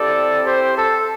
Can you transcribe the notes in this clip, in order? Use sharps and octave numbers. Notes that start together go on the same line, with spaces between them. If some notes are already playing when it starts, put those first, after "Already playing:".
Already playing: C4 E4 G4 A4 D5
G4 C5
A4